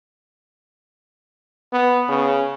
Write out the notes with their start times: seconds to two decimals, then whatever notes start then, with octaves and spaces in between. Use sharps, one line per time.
1.73 B3
2.09 C#3